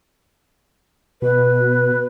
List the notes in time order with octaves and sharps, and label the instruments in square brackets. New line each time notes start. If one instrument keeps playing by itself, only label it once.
[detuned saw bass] B2 [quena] B4